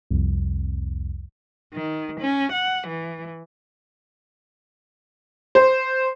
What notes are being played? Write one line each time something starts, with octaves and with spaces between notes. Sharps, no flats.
C2 F2
D#3
C#4
F#5
E3
C5